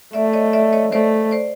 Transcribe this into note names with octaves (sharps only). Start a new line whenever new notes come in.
A3 D5 E5
C#5 D#5
D5 E5
C#5 D#5
A3 C5 D5
C5 D5